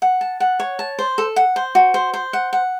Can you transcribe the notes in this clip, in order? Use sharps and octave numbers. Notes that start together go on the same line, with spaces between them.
F#5
A5
F#5
C#5
A5
C5
A4
F#5
C5
F#4
C5
C5
F#5
F#5